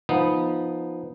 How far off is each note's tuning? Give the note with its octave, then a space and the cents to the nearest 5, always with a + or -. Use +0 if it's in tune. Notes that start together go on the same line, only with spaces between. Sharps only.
F3 +0 B3 -10 D#4 +0